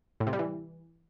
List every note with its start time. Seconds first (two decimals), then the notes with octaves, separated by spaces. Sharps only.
0.20 A2
0.27 C3
0.33 G3
0.39 E3